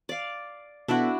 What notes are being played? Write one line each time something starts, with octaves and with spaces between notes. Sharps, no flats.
D5 F5
B2 D4 E4 F#4 A4 B5